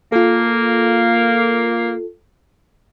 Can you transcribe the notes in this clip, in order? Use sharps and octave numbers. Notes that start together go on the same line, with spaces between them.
A#3 F4 A4